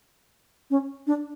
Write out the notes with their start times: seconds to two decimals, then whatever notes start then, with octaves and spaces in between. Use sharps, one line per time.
0.70 C#4
1.07 D4